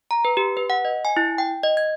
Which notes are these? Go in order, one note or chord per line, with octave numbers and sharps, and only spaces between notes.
A#5
B4
G4
B4
F#5
D#5
G#5
E4
G5
D#5
G#6